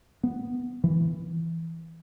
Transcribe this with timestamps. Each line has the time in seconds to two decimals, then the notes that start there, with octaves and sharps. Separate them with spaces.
0.23 B3
0.84 E3